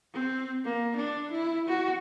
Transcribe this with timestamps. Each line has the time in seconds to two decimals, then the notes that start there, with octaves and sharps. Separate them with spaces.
0.14 C4
0.65 A#3
0.97 D4
1.31 E4
1.68 F#4